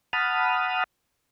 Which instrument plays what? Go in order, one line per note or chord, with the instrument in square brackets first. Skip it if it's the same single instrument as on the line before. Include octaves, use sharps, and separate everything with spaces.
[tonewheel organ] F#5 A5 B5 D#6 F6